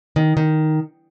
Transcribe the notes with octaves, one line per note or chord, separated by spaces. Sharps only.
D#3
D#3